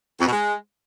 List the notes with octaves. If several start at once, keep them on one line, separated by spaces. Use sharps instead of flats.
F2
B2
G#3